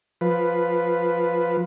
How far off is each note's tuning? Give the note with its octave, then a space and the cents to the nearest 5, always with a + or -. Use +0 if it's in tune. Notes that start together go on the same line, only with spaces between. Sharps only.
F3 +0 B4 +0